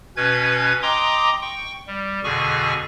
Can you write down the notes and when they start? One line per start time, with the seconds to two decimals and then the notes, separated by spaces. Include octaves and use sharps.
0.16 B2 C#4 B4 G#6
0.82 D#5 G5 A#5 C6 D6 D#6
1.42 G5 C#6
1.87 G3
2.24 F2 B2 D3 G#4 G#5 C#6